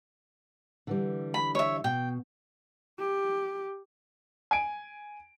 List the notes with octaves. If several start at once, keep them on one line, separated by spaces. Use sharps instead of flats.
D3 E3 G3
B5
C#5 E5
B2 G5
G4
G#5 D7